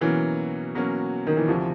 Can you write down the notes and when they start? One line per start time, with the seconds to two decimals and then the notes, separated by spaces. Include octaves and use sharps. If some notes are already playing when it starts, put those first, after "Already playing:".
0.01 B2 E3 F#3 A#3 C#4
0.75 B2 F#3 A#3 C#4
1.27 D#3
1.37 E3
1.48 D2 C3 E3 F3